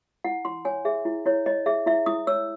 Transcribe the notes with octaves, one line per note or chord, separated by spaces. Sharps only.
E4 F#5
E4 C6
C#5 G#5
G#4 E5
E4
E4 C#5
C#5 D#5
G#4 E5
E4 E5
E4 D#6
C#5 E6